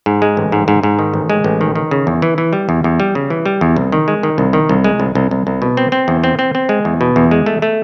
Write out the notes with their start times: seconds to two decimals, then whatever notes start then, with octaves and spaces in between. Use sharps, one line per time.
0.06 G#2
0.22 G#3
0.37 A1
0.52 G#2
0.68 G#2
0.83 G#2
0.99 D#3
1.14 A1
1.30 G#3
1.44 A1
1.61 D#3
1.75 D#3
1.91 C#3
2.07 E2
2.22 E3
2.38 E3
2.53 G3
2.69 E2
2.84 E2
3.00 G3
3.15 C#3
3.30 E3
3.46 G3
3.61 E2
3.77 C2
3.92 D#3
4.08 G#3
4.23 D#3
4.38 C2
4.53 D#3
4.69 C2
4.84 G#3
5.00 C2
5.15 C2
5.31 C2
5.47 C2
5.62 B2
5.77 C4
5.92 C4
6.08 E2
6.24 C4
6.39 C4
6.55 C4
6.69 G#3
6.85 E2
7.01 B2
7.16 E2
7.31 G#3
7.46 A3
7.62 A3